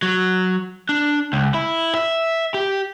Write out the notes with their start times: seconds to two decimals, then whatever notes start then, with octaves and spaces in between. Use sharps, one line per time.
0.03 F#3
0.89 D4
1.33 C#2
1.54 E4
1.95 E5
2.54 G4